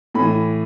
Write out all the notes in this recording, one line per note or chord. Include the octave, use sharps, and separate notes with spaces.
A2 E3 B5